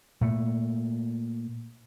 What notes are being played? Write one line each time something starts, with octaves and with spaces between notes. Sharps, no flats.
A#2 A3